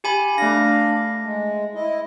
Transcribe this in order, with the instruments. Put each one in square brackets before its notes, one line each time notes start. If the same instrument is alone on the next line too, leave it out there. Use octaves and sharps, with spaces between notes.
[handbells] G4 G#5 B5
[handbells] A3 A#6 [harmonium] D4 F5
[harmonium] G#3
E4 D#5